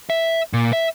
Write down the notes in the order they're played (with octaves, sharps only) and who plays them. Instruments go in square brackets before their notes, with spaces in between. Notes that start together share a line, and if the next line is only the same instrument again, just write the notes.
[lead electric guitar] E5
A#2
E5